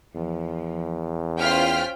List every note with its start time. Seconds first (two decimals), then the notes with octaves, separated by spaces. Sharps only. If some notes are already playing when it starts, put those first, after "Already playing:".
0.16 E2 F3
1.39 C#4 F4 C5 G5 F6 B6